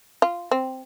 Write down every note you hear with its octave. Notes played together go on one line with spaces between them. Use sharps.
F4
C4